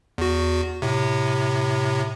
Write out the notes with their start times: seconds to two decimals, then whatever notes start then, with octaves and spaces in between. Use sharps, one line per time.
0.18 E2 F#4
0.82 A2 C3